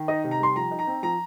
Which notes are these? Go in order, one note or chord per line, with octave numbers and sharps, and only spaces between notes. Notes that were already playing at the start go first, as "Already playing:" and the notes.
Already playing: D#3
D#4 D#5
C3
A#5
G3 C6
F3 A#5
D#4
A#5
C4
F3 A#5